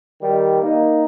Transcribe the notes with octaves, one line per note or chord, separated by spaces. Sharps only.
D#3 G3
A#3 D#4